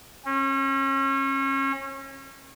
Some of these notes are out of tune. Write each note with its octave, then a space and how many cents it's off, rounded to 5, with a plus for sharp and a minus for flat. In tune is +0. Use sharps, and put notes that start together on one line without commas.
C#4 -35